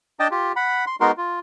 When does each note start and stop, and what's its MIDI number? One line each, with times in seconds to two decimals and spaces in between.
0.20 0.28 62
0.20 0.28 75
0.20 0.28 79
0.20 0.28 81
0.20 0.28 87
0.31 0.52 65
0.31 0.52 67
0.56 0.85 78
0.56 0.85 83
0.87 0.96 84
1.01 1.11 56
1.01 1.11 59
1.01 1.11 63
1.01 1.11 66
1.01 1.11 70
1.01 1.11 84
1.17 1.40 65